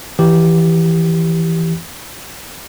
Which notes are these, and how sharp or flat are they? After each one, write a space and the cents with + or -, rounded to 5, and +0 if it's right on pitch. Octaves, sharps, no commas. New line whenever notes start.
E3 +0 G4 -5